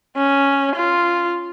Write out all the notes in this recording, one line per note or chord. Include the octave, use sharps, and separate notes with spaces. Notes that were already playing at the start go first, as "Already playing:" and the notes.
C#4
F4